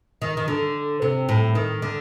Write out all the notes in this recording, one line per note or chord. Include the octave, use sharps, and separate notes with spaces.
D#3
D#3
D3
C3
A2
D#3
D3